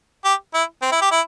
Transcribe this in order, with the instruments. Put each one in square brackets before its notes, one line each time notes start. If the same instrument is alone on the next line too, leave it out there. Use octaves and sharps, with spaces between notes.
[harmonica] G4
E4
C4
E4
G4
E4